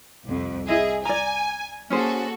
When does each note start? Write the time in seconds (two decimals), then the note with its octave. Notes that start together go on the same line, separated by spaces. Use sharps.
0.25 C2 F2
0.68 E4 G#4 D#5
1.05 D5 G#5 A#5
1.90 A#3 C#4 F#4 G#4 A4 C5